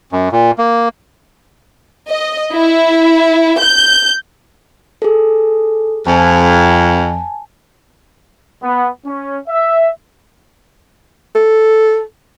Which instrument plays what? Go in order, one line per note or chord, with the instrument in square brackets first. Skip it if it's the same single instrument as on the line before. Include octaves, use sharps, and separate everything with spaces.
[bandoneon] F#2
A#2
A#3
[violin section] D#5
E4
G6
[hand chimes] G#4 A4
[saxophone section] F2 [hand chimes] G#5 A5
[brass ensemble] B3
C#4
E5
[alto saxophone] A4